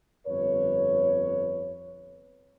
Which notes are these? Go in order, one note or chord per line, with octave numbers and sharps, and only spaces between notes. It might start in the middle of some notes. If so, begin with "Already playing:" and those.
G1 F2 B4 C#5